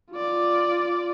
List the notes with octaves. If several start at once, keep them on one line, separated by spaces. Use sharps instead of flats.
F4 D5